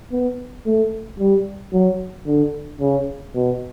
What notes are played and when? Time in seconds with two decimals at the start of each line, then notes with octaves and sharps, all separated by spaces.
0.12 B3
0.66 A3
1.20 G3
1.73 F#3
2.27 D3
2.81 C#3
3.35 B2